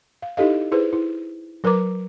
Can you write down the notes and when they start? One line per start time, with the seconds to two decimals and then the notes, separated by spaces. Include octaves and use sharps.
0.22 F5
0.37 D#4 E4 G4 A4 D#5 F5
0.72 E4 G#4 B4 C5
0.93 E4
1.64 F#3 A#4 B4 A#5 D6